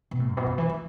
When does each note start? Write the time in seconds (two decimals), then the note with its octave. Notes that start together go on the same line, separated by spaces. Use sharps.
0.11 B2
0.20 A2
0.29 F#2
0.37 B2
0.46 C#3
0.58 E3
0.69 E3